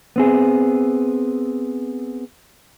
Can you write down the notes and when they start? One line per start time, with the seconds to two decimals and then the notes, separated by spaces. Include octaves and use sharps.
0.16 B3 C4 G#4